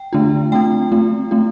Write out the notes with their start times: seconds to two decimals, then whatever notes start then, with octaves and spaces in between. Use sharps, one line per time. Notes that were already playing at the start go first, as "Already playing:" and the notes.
Already playing: G5
0.13 D3 A3 D4 F4
0.52 A3 C4 F4 G5
0.92 A3 C4 F4
1.31 A3 C4 F4